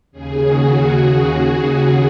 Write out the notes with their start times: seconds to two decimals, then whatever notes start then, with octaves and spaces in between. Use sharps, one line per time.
0.12 D#2 C#3 G#4
0.42 F#4